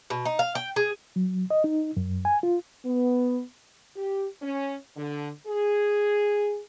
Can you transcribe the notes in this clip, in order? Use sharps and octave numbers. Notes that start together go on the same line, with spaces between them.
B2
D#4
F5
G5
G#4
F#3
D#5
D#4
F#2
G#5
F4
B3
G4
C#4
D3
G#4